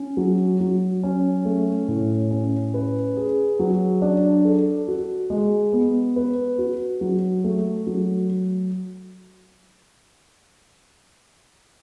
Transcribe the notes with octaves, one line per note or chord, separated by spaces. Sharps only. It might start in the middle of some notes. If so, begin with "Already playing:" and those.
Already playing: C#4
F#3
F#3
C#4
A3
A2
C#4
B4
G#4
F#3
D4
A4
F#4
G#3
B3
B4
F#4
F#3
A3
F#3